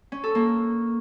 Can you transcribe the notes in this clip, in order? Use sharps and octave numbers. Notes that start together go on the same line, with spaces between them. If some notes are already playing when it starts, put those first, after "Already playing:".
C#4
A4
A#3